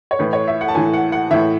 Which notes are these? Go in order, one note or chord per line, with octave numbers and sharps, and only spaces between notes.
C#5
A2 E3 B4
C#5
E5
F#5
A5
A2 E3 G#5
F#5
F#5
A2 E3 E5